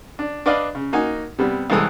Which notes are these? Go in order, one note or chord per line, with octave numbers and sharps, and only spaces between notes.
D4
D4 B4 D5 D#5 F5
C#3
A#3 D#4 F#4 G#5
C3 G3 B3
C2 E3 G#3 A4 D#6 F#6